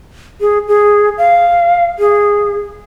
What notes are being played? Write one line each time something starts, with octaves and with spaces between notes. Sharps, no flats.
G#4
G#4
F5
G#4